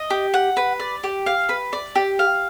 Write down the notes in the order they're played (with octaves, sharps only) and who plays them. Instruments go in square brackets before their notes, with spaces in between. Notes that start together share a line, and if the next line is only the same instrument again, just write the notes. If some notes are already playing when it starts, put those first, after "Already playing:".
Already playing: [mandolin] D#5
G4
F#5
B4
D5
G4
F5
B4
D5
G4
F5